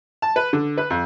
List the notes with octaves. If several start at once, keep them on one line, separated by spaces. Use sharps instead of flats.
A5
B4
D3
B4
F2